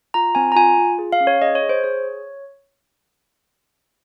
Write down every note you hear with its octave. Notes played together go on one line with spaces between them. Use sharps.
F4 A#5
C4 G#5
A#5
F4 G#5
F4
G#4
F5
C#4
C#5
G#4 D#5
C#5
G#4
C5
G#4 C#5